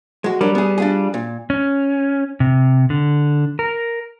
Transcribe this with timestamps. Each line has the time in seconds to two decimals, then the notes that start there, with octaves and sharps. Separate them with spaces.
0.24 G#3 F#4
0.41 F#3 G3 D4 A#4
0.55 B3 G#4
0.78 D4 F4 G#4
1.14 A#2
1.50 C#4
2.40 C3
2.90 D3
3.59 A#4